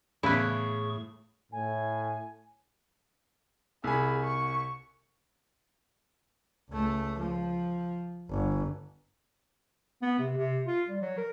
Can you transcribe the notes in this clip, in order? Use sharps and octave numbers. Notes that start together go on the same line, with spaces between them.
E2 A2 C#3 E4 G#4 B4 C#6
A2 G#5
C2 G#4 G#5 B5
C#6
C#2 A3
F3
G1
B3
C3
C3
F4
G3
F#3
A#4